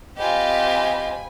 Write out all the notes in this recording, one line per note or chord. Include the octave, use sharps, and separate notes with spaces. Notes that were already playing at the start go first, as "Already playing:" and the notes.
C4 F4 G4 D#5 G#5 B5